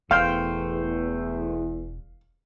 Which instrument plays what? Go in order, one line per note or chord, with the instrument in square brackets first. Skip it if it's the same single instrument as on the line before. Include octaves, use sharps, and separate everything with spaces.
[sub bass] E1 [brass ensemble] E2 [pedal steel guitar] A3 C5 G5 [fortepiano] F5